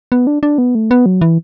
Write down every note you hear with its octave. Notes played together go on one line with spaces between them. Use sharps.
B3
D4
D4
B3
A3
B3
F#3
E3